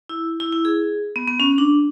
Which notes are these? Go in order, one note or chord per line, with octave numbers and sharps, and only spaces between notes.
E4
E4
E4
G#4
B3
B3
C#4
D4